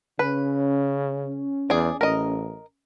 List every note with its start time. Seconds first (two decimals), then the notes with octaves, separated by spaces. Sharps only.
0.19 C#3 C#4 B4
1.70 E2 G#4 D5
2.01 A1 A#4 D#5